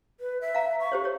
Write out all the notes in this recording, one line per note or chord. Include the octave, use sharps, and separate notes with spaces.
B4
E5
F5 A#5
C#6
G4 C5 C#5
G4 C#5